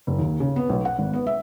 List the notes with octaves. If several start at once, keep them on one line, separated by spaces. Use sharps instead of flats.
F#1
D#2
C#3
B3
B1
F#5
G#1
B3
E5